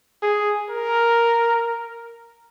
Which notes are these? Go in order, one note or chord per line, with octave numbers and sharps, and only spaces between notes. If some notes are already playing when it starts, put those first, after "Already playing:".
G#4
A#4